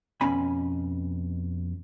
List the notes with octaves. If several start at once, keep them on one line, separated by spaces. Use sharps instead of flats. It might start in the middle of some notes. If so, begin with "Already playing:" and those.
F2 B2 C#4 G#5 B5